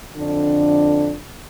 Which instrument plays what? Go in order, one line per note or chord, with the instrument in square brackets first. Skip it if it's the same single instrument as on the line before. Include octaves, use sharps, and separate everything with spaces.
[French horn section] F2 D3 D4